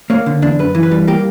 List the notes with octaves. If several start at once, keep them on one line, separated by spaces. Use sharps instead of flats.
A#3 C#5
D3
E2 D4
F#2 B4
E3
B4
G3
A#3 G4